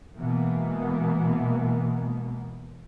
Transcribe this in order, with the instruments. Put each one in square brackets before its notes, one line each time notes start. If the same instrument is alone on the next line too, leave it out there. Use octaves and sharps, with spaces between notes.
[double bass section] B2 E3 G#3 A#3 B3